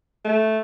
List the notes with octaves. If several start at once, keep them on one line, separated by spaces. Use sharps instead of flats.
A3